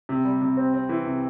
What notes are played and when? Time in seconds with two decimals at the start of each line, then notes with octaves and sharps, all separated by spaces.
0.09 C3
0.25 G3
0.42 C3
0.57 C4
0.74 C4
0.89 E3
1.06 C3